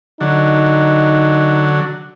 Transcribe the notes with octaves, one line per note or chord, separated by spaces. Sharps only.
D3 F#3 D#4